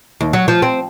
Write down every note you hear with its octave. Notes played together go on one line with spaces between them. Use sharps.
D#2
F#3
F3
C4